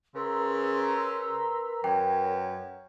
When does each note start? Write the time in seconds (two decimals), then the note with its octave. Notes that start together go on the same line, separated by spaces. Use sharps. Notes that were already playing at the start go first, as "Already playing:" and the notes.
0.15 C#3 A#4 B4 A#5 C6 E6
1.84 F#2 C#5 G5